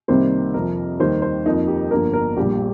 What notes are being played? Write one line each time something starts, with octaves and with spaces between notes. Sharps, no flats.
C2 C3 D#3 G3 A#3 C5
F2 C3 F3 A#4
D#2 D#3 G3 A#3 C5
C5
F2 F3 A#3 D#4
G4
G1 G2 F3 A#3 A#4
A#4
A#1 A#2 G3 G4